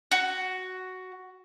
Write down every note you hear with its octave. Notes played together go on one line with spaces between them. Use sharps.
F#4